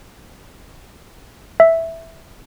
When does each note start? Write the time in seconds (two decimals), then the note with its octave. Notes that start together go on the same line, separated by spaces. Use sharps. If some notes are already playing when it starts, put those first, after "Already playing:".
1.60 E5